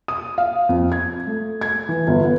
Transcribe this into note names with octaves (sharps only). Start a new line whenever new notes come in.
D#6
F5
F2
G#6
A3
G#6
E3
G1
B3